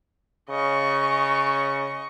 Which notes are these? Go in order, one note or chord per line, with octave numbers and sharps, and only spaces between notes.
C#3 D#5 C#6